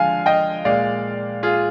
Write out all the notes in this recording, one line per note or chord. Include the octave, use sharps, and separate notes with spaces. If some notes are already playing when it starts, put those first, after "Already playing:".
Already playing: D3 F3 G#3 F5 G#5
D#5 G5
A#2 G#3 D5 F5
F4 G#4